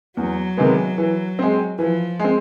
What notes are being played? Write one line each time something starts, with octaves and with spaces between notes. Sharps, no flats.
E2 F#3
C3 D#3 G#3 B3
E3
G#3 C4
E3 F3
G#3 C4